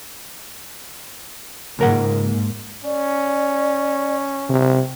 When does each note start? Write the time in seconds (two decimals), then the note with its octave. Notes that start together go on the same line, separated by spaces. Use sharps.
1.79 C#2 G#2 A#3 A#4 F#5
2.85 C#4 D5
4.49 C3